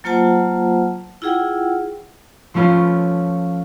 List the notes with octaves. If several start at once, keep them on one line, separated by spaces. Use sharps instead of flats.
F#3 A#3 F4 C5 F#5 A5
E4 F4 G#4 F#5 G5
F3 A3 C#4 F4 B4